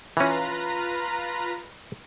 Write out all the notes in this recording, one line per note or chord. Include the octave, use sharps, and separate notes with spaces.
E3 C#4 F4 B4 A#5